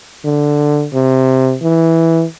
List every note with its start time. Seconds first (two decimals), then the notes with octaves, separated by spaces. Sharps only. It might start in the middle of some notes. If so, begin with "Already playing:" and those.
0.25 D3
0.94 C3
1.62 E3